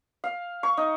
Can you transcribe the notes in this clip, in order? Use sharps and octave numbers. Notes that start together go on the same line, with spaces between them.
F5
C#6
D#4